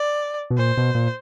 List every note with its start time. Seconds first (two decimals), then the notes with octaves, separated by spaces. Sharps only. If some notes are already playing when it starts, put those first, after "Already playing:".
Already playing: D5
0.50 B2
0.58 A#2 C5
0.77 B2
0.95 A#2